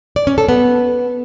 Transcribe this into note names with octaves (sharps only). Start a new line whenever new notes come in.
D5
C#4
A4
B3